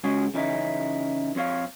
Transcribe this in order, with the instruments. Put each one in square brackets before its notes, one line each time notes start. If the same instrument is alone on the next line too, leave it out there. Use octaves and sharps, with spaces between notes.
[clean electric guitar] C#3 G#3 C#4 F#4 G#4
C#3 E3 C#4 D#4 E4
F2 C4 C#5 F5